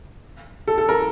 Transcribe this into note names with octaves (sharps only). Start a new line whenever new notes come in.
A4
A4
A#4